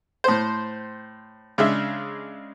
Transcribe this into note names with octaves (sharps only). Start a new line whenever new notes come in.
A2 C5
C#3 G#3 D4 E5